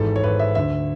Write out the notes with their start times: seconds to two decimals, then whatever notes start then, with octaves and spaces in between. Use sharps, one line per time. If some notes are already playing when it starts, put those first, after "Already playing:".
Already playing: G#1 G#2 E3 A4
0.16 C#5
0.24 G#1 G#2 E3 B4
0.39 E5
0.55 D2 D3 E5